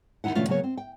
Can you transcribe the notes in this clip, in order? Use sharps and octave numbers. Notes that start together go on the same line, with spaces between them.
D#2 G#2 D#4 E4 F#5
B2 D3 E3 A3 C#4 F4
C#3 F#3 A#3 B3 C#5
C4
G5